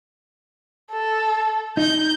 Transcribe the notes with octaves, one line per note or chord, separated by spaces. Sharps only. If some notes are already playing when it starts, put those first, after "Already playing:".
A4
D#4 G6